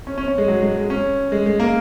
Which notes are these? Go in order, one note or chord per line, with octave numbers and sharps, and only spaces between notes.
C#4
C#4
C#4
G#3
F#3
G#3
G#3
C#4
G#3
G#3
A#3